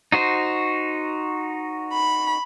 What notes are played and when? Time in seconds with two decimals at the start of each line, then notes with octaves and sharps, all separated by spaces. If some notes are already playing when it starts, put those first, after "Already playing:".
0.12 D#4 F#4 C5
1.93 B5